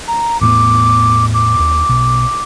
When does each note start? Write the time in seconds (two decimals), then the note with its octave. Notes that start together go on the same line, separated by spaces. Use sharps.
0.08 A#5
0.41 E2 A2 B3 D6
1.34 D6
1.59 D#2
1.89 B1 B2